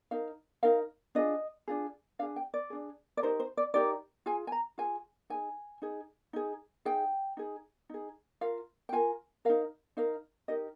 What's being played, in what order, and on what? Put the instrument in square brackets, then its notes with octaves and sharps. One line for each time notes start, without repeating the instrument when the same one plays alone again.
[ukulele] D#4 A#4 F5
D#4 A#4 F5
D4 F4 G#4 D#5
D4 F4 G#4
D4 F5
G#4
G5
D5
D4 G#4
D5
D#4 G4 A#4 C5
C5
D5
D#4 G4 A#4 D5
F4 G#4 G#5
G#5
A#5
F4 G#4 G#5
D#4 G#4 G#5
D#4 G#4
D#4 G#4
D#4 G#4 G5
D#4 G#4
D#4 G#4
F4 A#4 F5
G5
F4 A#4 G#5
D#4 A#4 F5
D#4 A#4 F5
D#4 G4 A#4 D#5